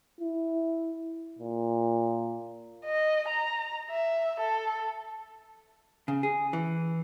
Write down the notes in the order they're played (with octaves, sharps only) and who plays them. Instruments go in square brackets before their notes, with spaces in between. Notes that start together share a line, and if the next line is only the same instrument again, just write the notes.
[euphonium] E4
A#2
[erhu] D#5
A#5
E5
A4
[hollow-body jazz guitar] C#3
G#4
E3